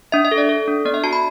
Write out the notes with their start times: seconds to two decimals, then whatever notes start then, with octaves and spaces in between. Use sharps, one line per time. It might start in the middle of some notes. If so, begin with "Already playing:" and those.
0.12 D4 E5
0.25 E5
0.31 A4
0.38 D5
0.49 A4
0.68 D4
0.85 B3 D5
0.94 E5
1.04 F#4 A5
1.13 B5